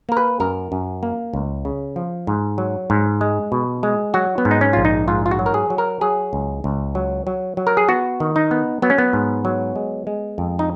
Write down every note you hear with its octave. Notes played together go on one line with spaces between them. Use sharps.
A#3 A#4
B4
F#2 A#4
F#2
A#3
C#2
C#3
F3
G#2
F#3
G#2
G#3
B2
G#3
F#3 F#4
B3
G#2
D#4
C#4
A#1 F4
D#4
G#2 F4
F4
F#4
F#3
A#4
G#4
F#3
A#4
F#3 G#4
C#2
C#2
F#3
F#3
F#3
A#4
G#4
B3 F#4
D#3
D#4
B3
F#3 B3
C#4
B3
G#2
F#3
G#3
G#3
F2
D#4